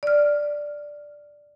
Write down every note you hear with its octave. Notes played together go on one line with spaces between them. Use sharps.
D5 F6